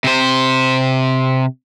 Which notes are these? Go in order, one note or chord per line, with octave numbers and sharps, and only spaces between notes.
C3 C5